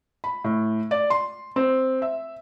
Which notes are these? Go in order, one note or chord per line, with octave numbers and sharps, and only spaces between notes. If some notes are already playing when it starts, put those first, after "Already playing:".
B5
A2
D5
C6
C4
E5